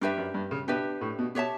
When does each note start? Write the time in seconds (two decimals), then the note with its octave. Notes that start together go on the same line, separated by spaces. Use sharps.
0.01 G2 D4 G4 B4 E5
0.17 F#2
0.34 G2
0.51 C#3
0.67 B2 D4 G4 B4 E5
1.01 A2
1.19 B2
1.35 B2 G4 C#5 E5 A5